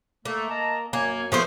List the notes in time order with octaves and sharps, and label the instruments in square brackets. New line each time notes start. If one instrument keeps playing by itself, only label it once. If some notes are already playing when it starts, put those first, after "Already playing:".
[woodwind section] A3 [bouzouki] A#3
[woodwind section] D#5 A5 A#5
[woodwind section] F#2 C#5 G#5 [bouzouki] A#3
[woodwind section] C#2 A#3 D#6 [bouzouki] F3 A3 C5